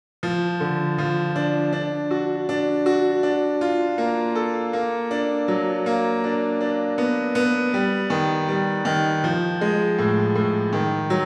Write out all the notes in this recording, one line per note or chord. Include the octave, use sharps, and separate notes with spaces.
F3
D3
F3
D4
D4
F#4
D4
F#4
D4
F4
A#3
A4
A#3
D4
F#3
A#3
D4
D4
B3
B3
G3
D#3
G3
D#3
F3
G#3
A2
A2
D#3
F#3